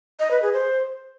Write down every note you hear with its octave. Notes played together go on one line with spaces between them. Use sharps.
D#5
B4
G#4
C5